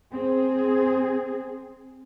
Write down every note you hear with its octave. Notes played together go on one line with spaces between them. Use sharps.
C4 G#4